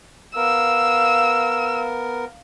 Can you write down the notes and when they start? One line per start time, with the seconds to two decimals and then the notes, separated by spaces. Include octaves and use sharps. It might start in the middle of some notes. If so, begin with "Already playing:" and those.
0.36 B3 A#4 F5 E6